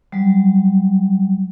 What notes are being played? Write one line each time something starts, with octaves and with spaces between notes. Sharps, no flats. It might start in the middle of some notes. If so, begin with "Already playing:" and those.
F#3 G3